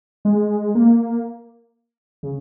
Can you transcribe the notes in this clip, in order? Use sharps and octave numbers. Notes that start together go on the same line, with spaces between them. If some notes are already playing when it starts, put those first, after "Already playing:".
G#3
A#3
C#3